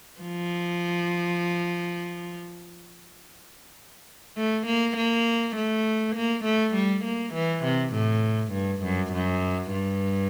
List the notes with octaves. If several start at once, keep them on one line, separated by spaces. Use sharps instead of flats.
F3
A3
A#3
A#3
A3
A#3
A3
G3
A#3
E3
C3
A2
G2
F#2
F#2
G2